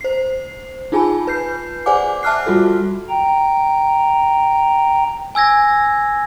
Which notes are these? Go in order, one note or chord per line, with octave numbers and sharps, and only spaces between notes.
C5 C7
D#4 F4 G#4 G#5 A5 B5
B4 G6 C7
G#4 C5 D5 F#5 G#5 D6
E5 A5 D6 F6 F#6 C7
G3 F4 F#4 A4
G5 A#5
G#5 E6 G#6 A#6